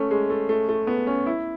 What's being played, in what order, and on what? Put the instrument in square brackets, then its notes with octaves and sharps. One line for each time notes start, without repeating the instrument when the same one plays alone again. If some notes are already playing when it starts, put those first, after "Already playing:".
Already playing: [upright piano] A3 C#4
G#3
A3
A3
A3
B3
C#4
E4